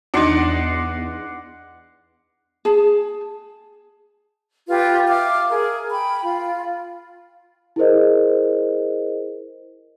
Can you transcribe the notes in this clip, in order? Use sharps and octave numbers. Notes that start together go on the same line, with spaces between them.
E2 D4 D#4 F#5 C6 D6
G#4 A5
F4 G4 B4
E5 F5 D6 F6
G#4 A#4
G5 B5
F4
E4 G#4 A#4 C5 D#5